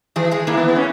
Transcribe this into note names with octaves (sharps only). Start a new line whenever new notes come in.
E3 G#3 G#4
G#3 G#4
E3 A#3 E4
B3
B3
C#4